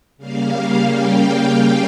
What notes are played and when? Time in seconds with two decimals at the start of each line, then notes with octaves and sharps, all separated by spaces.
0.17 C#3 G3 A#3 F5
0.91 G5